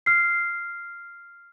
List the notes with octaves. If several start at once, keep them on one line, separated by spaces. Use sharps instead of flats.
F6 C7